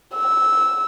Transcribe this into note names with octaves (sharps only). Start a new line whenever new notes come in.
E6